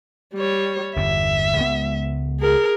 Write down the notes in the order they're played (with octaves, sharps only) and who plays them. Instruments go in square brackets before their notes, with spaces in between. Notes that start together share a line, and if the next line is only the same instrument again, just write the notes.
[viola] G3 C#5
[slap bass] G1 E2 [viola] E5
[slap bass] C#2 G#3 B3
[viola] G#4 A#4